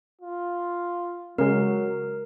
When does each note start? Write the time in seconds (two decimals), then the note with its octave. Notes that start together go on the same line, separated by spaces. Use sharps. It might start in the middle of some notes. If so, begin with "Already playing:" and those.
0.21 F4
1.38 C#3 F#3 G#3 A#4